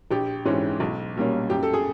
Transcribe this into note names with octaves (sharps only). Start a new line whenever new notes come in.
A#1 G4
G#2 E3 G#3 C#4
B1
A#2 G3 A#3 C#4
F#2 G4
A4
G#4